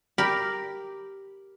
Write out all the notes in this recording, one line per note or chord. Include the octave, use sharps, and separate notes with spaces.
G4 A#4 B5